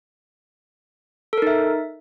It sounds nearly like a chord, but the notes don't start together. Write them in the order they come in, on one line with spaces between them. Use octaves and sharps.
A4 A#4 D#4 E5